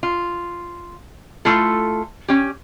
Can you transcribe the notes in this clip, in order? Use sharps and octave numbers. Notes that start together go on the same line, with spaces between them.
F4
A3 E4 F4 A4
C#4 G4